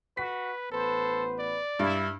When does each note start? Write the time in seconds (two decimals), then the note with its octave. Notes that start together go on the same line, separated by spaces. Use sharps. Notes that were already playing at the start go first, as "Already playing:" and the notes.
0.17 F#4 B4 B6
0.72 A1 B3 A4 B4 C5
1.39 D5
1.79 G2 E4